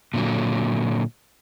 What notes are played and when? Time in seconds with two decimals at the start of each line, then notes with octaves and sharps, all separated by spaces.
0.14 A#2 D3 F#3